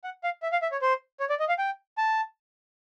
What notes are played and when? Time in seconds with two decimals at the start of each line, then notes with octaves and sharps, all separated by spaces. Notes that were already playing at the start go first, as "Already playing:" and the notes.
0.04 F#5
0.24 F5
0.42 E5
0.52 F5
0.62 E5
0.72 C#5
0.82 C5
1.20 C#5
1.30 D5
1.40 D#5
1.49 F5
1.59 G5
1.98 A5